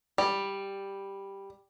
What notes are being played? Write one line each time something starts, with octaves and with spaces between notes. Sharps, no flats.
G3 D5